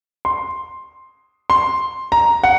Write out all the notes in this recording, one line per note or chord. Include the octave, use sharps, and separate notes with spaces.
C6
C6
A#5
F#5